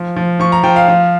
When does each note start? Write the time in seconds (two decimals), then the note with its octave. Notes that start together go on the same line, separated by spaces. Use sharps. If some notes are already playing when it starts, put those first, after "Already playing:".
Already playing: F3
0.16 F3
0.40 F3 C#6
0.52 A#5
0.63 F3 G5
0.76 F5
0.88 F3